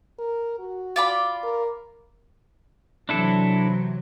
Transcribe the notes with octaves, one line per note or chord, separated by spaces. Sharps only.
A#4
F#4
F4 D5 B5
A#4
C3 E3 F#3 D4 E4 A4